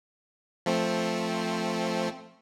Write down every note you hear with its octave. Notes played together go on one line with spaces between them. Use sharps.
F3 A3 C4